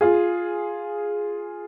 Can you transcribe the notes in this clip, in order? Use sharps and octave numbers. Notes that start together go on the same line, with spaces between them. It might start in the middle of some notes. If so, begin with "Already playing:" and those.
F4 G#4